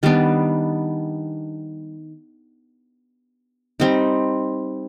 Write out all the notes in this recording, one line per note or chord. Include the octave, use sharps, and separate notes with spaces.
D#3 G3 B3 D4
G3 C4 D#4